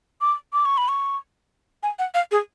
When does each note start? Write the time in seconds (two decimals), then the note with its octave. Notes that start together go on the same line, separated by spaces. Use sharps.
0.21 D6
0.53 D6
0.65 C#6
0.78 B5
0.88 C#6
1.83 G#5
1.99 F#5
2.14 F5
2.31 G#4